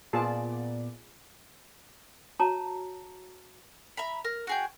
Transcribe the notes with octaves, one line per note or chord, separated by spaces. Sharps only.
A#2 B3 F4 G#4 D5 A5
F#4 C#5 A5 A#5
E5 A#5 B5
A#4
F#4 G#4 G5